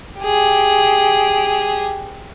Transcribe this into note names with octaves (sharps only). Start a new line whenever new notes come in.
G4 G#4